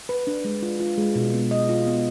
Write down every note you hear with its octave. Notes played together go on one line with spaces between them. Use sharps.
B4
D4
G#3
F4
F4
G#3
B2
B3
D#5
F4
B3